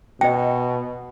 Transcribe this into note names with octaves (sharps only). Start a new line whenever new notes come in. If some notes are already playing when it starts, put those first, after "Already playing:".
B2 D#5 G5